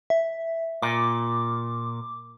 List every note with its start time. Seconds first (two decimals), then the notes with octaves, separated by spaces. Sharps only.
0.10 E5
0.82 A#2 D6